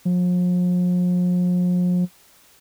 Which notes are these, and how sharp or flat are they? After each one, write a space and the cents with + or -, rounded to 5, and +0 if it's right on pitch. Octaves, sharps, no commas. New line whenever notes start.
F3 +40